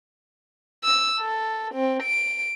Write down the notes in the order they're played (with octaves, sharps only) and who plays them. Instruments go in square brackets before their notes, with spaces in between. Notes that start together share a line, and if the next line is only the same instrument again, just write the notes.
[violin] E6
A4
C4
D7